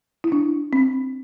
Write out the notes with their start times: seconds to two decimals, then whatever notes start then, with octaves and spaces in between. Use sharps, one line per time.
0.24 E4
0.32 D4
0.73 C4